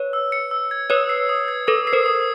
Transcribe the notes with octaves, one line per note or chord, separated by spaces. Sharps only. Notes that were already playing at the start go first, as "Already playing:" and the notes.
Already playing: B4 C#5
E6
C#7
E6
G#6
B4 C#5 D#6
C7
D#6
G#6
A4 B4 D#6
C7
A#4 C5
D#6